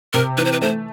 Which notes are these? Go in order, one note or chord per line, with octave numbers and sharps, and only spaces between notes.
C3 A#4
E3 B4
C5
B4
A3 C5